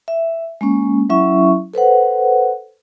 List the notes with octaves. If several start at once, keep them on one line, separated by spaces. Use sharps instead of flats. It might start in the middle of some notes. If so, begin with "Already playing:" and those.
E5
G#3 A#3 C#4
F#3 C#4 E4 E5 C#6
A4 B4 C5 F#5